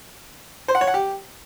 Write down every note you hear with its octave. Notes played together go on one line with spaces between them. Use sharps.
C5
F#5
C#5
F#5
G4